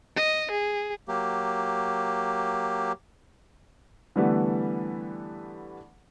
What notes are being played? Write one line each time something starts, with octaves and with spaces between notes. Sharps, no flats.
D#5
G#4
F#3 A#3 G4
D3 E3 G3 A3 B3